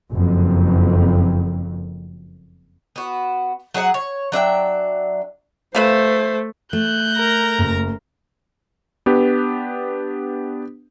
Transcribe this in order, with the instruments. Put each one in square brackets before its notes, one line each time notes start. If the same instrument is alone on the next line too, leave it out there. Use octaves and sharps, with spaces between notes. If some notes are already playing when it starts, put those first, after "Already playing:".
[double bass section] F#1 F2
[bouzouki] B3 F#4
F#3 G#4 D#5 F#5
C#5
F#3 D4 E5 G5
[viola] A3 [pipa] B4 E5 F5 [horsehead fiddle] C5
[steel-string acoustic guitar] A3 [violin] F#6 G6
[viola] A#4 A#5
[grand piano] F#1
[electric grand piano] B3 D4 G4 B4